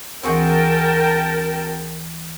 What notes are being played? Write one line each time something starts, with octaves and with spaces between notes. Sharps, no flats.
D2 E3 C4 F#4 G#4 A#4 G5 A5